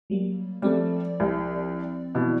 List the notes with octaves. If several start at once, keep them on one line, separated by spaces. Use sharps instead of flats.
F#3 G3 A#3
F3 G3 A3 C4 D5
C2
B2 E3